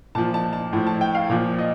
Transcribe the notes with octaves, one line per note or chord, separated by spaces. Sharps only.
A#2 F3 A5
A5
A5
A2 F3
A5
G5
F5
A#2 F3
D#5